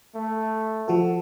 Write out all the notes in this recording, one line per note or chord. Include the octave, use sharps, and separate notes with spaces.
A3
F3 F#4 A4